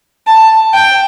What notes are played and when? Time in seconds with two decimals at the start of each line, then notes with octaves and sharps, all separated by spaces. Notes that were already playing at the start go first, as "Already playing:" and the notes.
0.27 A5
0.74 G5